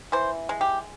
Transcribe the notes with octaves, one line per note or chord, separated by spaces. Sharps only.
E3 C5
G#3
G4